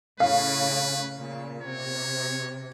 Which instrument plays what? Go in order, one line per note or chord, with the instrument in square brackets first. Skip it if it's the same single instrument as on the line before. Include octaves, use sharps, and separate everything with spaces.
[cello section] A2 C#3 C#4 [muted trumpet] B4 [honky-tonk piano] F5
[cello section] A#2 C#3
[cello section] C3 [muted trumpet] C#5